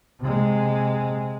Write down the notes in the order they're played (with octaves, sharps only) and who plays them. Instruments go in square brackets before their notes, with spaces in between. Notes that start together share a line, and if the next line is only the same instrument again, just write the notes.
[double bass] C3 G#3